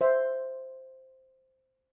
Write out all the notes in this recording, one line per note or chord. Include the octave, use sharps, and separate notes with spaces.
C5 E5